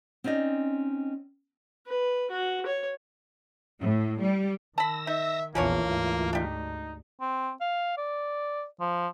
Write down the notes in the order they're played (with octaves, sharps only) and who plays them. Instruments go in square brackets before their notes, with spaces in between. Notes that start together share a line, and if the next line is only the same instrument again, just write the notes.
[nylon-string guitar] C4 C#4 D#4 D5 D#5
[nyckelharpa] B4
F#4
C#5
[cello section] A2
G3
[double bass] D#3 [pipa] A5 B5 [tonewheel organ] E6 A#6
[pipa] D#4 [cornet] E5
[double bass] A#1 E2 [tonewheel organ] E3 F4 [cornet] A#3 [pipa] C#4 D4 C#5
[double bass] D2 G#2
[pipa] D4 G4 [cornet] D#4
[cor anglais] C4
F5
D5
F3